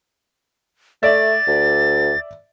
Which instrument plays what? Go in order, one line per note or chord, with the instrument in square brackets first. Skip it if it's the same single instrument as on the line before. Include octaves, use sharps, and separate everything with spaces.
[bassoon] A3 [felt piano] D5 E5 [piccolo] A6
[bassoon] D2